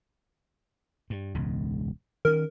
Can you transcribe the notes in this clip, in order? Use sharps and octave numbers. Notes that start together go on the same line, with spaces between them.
G2
E1 C#2 G#2
D#3 C#4 A#4